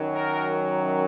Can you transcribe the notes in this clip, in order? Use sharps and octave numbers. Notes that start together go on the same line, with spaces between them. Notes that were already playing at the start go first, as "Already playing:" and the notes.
Already playing: F#2 D#3 F#3
A#4